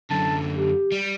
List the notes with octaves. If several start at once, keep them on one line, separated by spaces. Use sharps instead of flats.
F#2 D3 A5
G4
G3